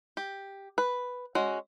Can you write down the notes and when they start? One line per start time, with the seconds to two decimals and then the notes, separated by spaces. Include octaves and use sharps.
0.17 G4
0.78 B4
1.35 G#3 C#4 F#4